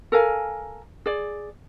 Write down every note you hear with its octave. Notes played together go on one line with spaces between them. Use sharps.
A4 A#4 F5 G#5
G#4 D5